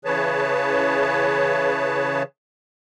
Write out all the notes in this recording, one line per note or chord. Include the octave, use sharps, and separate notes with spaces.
C#3 E3 G#4 B4 C#5 A5